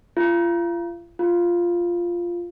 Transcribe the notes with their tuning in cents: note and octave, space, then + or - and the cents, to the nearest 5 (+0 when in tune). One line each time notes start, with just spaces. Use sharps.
F4 -35
F4 -5